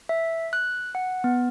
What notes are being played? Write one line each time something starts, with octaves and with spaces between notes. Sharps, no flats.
E5
F#6
F#5
B3